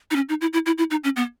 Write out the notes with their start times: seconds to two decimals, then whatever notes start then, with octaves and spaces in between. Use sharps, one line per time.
0.11 D#4
0.16 C#4
0.29 D#4
0.41 E4
0.53 E4
0.66 E4
0.78 E4
0.91 D#4
1.04 C#4
1.16 B3